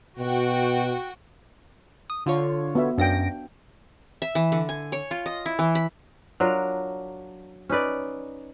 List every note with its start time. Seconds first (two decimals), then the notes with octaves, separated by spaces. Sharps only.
0.18 B2 F#4 G5
2.10 D#6
2.26 D3 F4 C#5
2.75 B3 F#4 E5
2.98 F#2 D4 F5 G5 A#6 D7
4.22 E5
4.35 E3
4.52 D3
4.69 G#5
4.92 C#5
5.11 F4
5.26 D#5
5.46 E4
5.59 E3
5.75 B5
6.40 F#3 D4 F4 A#4
7.70 C#4 D#4 B4 D5